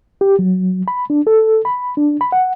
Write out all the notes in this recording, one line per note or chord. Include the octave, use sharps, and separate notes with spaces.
G4
F#3
B5
D4
A4
B5
D4
B5
F#5